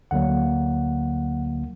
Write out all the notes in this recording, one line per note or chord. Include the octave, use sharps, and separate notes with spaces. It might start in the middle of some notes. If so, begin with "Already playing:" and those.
D2 D3 F#3 A#3 F#5